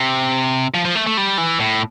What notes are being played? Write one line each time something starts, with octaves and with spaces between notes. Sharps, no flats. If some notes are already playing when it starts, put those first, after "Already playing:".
Already playing: C3
F3
F3
A3
A3
G3
E3
A2